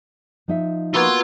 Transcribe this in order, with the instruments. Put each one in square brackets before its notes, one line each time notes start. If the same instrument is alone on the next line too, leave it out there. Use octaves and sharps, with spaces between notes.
[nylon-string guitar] F3 D#4 E5
[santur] A#3 B3 F#4 [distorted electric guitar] F4 C6 [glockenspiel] E6 F#6 G#6